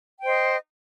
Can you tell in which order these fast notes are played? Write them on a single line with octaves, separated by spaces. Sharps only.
G5 C5 D#5